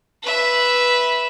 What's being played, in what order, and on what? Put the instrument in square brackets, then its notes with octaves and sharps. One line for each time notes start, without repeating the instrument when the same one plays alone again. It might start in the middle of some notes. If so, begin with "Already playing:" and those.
[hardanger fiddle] B4 E5